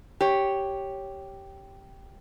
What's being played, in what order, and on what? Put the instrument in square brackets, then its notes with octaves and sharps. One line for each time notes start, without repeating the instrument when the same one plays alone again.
[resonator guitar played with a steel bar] G4 C#5